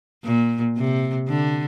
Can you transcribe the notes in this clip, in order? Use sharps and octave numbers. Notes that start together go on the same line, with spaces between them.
A#2
C3
D3